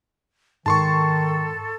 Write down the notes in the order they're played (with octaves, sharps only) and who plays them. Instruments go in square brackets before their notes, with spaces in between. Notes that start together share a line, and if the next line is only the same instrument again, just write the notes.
[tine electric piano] G#2 [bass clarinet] D#3 [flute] A4 [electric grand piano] A5 C6 C#6